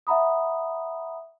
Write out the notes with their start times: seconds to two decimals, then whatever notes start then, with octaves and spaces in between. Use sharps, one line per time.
0.07 E5 F#5 A#5 B5 D#6